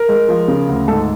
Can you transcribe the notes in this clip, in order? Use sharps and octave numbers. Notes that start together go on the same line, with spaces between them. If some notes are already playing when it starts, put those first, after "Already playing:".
Already playing: A#4
G#3
F3
C#3
D2
G#2 A4